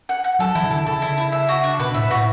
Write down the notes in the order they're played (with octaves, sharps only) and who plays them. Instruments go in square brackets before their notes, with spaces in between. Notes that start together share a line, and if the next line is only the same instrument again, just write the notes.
[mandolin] F#5
F#5
[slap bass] F#3 [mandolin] A4
[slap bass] E3 [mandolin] E4
[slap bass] C#3
[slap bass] D3 [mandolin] A4
[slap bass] C#3 [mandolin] A4
[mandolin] E4
E4
E5
F#4
D4
[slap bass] B2 [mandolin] B4
[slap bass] A2 [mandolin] E5
[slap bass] A2 [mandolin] F#4